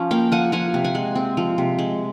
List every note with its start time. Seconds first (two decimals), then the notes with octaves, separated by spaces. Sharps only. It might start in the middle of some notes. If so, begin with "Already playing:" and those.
Already playing: F3 C#4
0.11 A#3 F5 G5
0.32 F3 F#5 G#5
0.52 F3 F#5 G#5
0.74 C3
0.84 F#5 G#5
0.95 G#3
1.15 C4
1.37 F3
1.58 C3
1.79 G#3